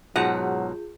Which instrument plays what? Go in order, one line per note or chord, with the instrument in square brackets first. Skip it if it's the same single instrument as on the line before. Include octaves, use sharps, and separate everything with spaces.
[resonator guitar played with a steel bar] G#2 B2 [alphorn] F#3 [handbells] F4 G#4 G6 [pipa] F#5